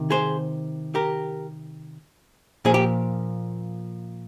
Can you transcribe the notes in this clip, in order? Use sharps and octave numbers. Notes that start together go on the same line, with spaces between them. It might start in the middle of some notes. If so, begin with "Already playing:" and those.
Already playing: C3 D#3
G#4 C5
G4 A#4
A#2 F3 G#4
G4